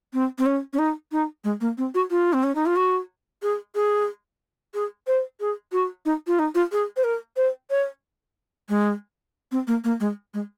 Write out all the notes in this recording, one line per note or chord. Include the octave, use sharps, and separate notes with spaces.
C4
C4
C#4
C#4
D#4
D#4
G#3
A#3
C4
F#4
F4
C4
C#4
D#4
F4
F#4
G#4
G#4
G#4
C5
G#4
F#4
D#4
F4
D#4
F4
G#4
C5
A#4
C5
C#5
G#3
C4
A#3
A#3
G#3
G#3